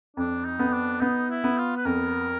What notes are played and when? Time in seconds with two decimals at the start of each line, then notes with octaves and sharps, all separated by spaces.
0.16 F2 D4
0.45 D#4
0.59 B3
0.73 D4
1.01 B3 D#4
1.30 E4
1.44 B3
1.58 F4
1.77 B4
1.85 F2 A#4